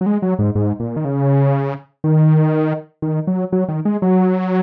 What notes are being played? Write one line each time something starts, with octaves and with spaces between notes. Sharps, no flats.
F#3
G#3
F#3
G#2
G#2
A#2
D#3
C#3
D#3
D#3
F#3
F#3
D#3
G#3
F#3